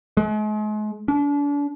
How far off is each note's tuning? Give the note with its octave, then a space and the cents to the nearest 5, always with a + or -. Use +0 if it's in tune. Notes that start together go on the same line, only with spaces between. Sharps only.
G#3 +40
D4 -35